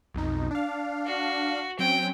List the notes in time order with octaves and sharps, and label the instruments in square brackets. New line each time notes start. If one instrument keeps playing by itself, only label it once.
[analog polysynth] B1 F2 D#4
D4 F5
[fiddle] F#4
[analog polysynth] F#3 C4 C#4 [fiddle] G5